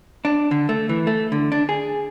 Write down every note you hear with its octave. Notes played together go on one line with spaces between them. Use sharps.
D4
D3
A3
E3
A3
D3
D4
G#4